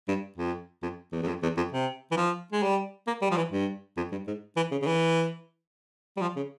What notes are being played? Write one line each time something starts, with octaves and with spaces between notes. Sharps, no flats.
G2
F2
F2
E2
E2
F2
E2
F2
C3
E3
F3
G#3
G3
A#3
G3
F3
E3
G2
F2
G2
G#2
E3
C#3
C#3
E3
G3
F3
C#3